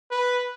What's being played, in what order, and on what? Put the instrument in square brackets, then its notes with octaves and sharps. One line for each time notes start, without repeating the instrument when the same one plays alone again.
[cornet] B4